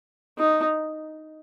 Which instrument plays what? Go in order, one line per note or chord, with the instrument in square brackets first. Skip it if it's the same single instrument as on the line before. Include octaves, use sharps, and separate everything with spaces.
[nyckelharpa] D#4